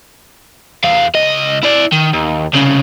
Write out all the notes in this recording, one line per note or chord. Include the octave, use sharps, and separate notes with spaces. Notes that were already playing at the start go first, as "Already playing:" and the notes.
E2 F5
C#2 D#5
E4 D5
D#3
D#2
C2 C#3